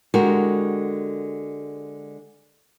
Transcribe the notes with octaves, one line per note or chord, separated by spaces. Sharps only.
D3 G#3 F#4 G4 A#4